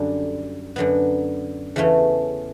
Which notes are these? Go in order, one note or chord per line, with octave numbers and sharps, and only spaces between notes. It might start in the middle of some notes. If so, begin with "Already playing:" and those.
Already playing: F#2 D3 G3
F#2 D3 F#3 B3
E2 C#3 E3 A3 C#4